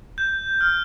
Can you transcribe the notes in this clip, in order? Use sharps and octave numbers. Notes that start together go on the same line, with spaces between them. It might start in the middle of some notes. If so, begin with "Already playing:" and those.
G6
F6